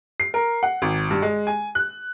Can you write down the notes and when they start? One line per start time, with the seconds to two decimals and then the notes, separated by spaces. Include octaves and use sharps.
0.20 C7
0.34 A#4
0.63 F#5
0.82 G#1
1.11 G2
1.22 G#3
1.47 G#5
1.75 F#6